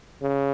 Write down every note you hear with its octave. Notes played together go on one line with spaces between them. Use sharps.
C#3